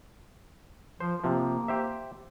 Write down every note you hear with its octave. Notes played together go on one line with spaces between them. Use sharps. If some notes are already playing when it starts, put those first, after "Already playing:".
F3 C5
C3 F3 A#3
G4 C5 E5